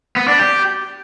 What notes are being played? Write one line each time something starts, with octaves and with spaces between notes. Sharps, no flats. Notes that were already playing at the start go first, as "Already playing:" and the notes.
B3
D4
G4